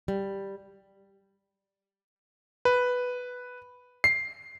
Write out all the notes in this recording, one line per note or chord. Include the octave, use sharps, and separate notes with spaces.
G3
B4
C7